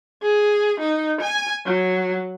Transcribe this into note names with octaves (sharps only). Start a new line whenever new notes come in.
G#4
D#4
G#5
F#3